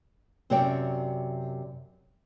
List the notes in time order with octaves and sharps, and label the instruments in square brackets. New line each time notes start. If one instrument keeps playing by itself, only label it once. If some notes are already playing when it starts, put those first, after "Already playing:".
[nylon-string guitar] F#2 C3 F#4 C#5 D5 G5